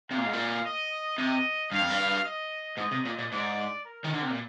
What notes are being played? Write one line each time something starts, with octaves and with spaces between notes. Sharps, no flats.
C3 F5
A#2
G#2
A#2
D#5
C3 D#5
G2 F5
F2
G2
D#5
G#2 D#5
C3
A#2
A#2
G#2 D5
A#4
D#3
D3
C3
A#2